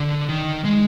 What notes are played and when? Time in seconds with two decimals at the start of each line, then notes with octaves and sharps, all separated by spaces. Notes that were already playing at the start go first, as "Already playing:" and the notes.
Already playing: D3
0.29 D#3
0.65 G#3